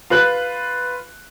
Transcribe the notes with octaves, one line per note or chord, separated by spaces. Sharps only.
F4 B4 F#6 F#7